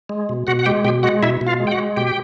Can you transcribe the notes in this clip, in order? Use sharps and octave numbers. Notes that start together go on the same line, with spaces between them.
G#3
B2
B2 F#4 F#5
F#5
G#3 G4 G5
B2 G4 G5
G#3 F#4 F#5
B2 E4 E5
B2
F4 F5
G#3
G5
F#4 F#5
G#3
B2 G4 G5